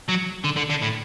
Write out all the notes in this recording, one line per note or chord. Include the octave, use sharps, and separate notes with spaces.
F#3
D3
D3
D3
A2